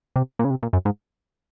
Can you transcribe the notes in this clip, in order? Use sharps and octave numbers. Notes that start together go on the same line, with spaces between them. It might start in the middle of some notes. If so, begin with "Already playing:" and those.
C3
A#2
C#3
C3
A#2
F#2
G#2